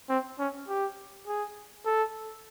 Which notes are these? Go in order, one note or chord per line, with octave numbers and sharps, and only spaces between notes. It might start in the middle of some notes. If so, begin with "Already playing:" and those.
C4
C#4
G4
G#4
A4